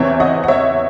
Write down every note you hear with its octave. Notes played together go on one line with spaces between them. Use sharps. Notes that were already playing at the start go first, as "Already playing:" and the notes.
Already playing: E2 C3 E3 C4 C#5 E5
D#5 F#5
F#5
C#5 E5